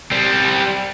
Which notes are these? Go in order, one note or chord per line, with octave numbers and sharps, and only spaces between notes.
G3 C4